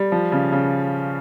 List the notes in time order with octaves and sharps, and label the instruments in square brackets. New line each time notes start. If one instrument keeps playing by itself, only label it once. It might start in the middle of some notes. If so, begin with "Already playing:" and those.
Already playing: [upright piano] G3
F3
C#3
C#3